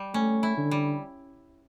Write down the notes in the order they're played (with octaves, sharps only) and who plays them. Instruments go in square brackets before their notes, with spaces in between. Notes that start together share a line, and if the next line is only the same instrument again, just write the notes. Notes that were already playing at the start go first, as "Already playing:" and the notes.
Already playing: [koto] G3
[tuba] A3 [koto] C#4
[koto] E4
[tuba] D3
[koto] G3